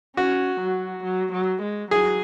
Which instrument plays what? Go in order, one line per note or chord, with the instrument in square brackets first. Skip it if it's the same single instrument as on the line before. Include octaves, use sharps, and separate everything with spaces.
[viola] C#4 [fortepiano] F#4
[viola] F#3
F#3
F#3
G#3
[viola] F#3 [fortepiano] G#4